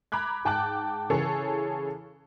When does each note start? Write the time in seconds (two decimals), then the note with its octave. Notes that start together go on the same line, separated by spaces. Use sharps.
0.12 A#5 B5 D6 F#6 G#6
0.45 G#2 G5 A5 D6 F#6
1.10 C#3 E3 G#4 A4 C#5